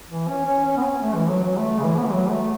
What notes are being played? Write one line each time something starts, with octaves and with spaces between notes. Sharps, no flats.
E3
C#4
C#4
C#4
B3
C#4
A3
E3
F#3
F#3
A3
C#3
E3
B3
A3
F#3
A3